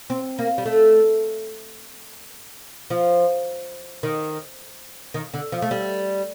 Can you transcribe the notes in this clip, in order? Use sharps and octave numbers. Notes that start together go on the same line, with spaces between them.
C4
A#3
G3
A3
F3
D#3
D#3
D3
F3
A3
G3